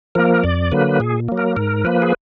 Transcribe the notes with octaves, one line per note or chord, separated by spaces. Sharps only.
F3 A#3 A#4
F2 D5
D3 F#3 A#3 B4
A#2 G#4
F#3 A#3
A#4
G#2 A#4
F3 A#3 B4
G#4